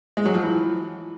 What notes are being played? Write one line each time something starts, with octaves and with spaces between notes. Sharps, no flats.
G#3
F#3
F3
E3